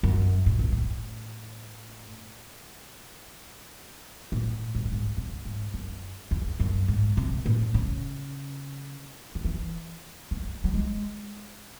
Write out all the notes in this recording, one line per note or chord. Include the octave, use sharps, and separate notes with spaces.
F#2
A2
C3
A2
A2
G#2
F#2
G#2
C3
G#2
F#2
E2
F#2
G#2
C3
A2
C#3
D#3
E3
A3
F#3
G#3